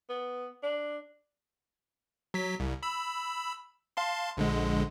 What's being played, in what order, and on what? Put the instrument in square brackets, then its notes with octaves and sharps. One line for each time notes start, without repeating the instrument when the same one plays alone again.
[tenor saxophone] B3
D4
[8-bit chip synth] F#3 B6
C2
B5 E6
F5 A5 C6
A#1 D3 G#3